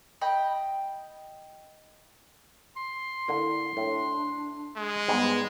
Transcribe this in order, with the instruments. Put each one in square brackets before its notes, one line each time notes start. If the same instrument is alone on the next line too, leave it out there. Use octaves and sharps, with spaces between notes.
[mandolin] D#5 G5 B5
[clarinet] C6
[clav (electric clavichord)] D3 A#3 [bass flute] E4
[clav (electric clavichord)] A2 [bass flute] D4
[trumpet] G#3
[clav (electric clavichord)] G#2 G3 [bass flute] B3